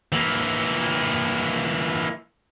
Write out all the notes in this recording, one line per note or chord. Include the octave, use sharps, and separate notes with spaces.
E3 A#3